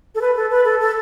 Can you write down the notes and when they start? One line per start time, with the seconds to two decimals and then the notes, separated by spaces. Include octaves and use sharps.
0.15 A4
0.21 B4
0.36 A4
0.51 B4
0.65 A4
0.81 A4